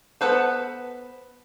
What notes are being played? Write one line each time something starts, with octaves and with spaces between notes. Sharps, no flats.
B3 A4 B4 C5